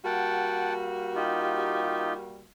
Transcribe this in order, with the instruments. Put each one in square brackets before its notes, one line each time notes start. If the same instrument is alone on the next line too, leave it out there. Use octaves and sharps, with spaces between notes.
[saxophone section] G3 A#3 F#4 [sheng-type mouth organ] F#5 G5 A5
[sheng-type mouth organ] D#4 F4 G4